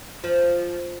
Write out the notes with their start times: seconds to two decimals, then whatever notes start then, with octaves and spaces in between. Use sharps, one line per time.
0.24 F3